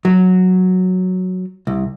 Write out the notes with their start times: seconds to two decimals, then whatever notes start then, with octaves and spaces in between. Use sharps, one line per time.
0.05 F#3
1.67 C2